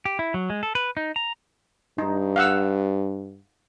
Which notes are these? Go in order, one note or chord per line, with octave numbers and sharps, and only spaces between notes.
G4
E4
F#3
G#3
A4
B4
D#4
A#5
G2 D#4
F5 F#5 E6